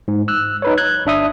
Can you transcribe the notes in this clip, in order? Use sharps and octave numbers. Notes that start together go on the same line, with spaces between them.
G#2
E6 F#6
D#4 B4 C#5
F#6 G#6
G1 D4 E5 D#6